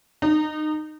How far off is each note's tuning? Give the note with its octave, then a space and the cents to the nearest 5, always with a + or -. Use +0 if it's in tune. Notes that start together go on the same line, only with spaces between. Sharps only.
D#4 -25